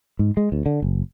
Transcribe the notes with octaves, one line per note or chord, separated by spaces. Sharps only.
G#2
G#3
D2
D3
F#1